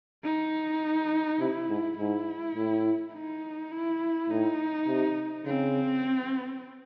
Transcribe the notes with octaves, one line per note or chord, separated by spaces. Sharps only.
D#4
C3 E4
G#2
G#2 E4
A2
D#4
E4
A2 D#4
C3
C#3 C4